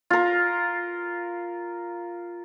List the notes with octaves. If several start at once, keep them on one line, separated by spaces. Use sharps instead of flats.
F4 A#4